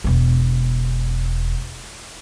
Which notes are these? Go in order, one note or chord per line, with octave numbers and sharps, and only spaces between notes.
E1 B3